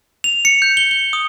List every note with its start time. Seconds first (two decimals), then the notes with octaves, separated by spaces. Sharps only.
0.24 F7
0.45 C#7
0.62 G6
0.77 G7
0.91 G7
1.13 D#6